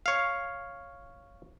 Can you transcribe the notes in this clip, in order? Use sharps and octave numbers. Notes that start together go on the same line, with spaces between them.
C#5 F5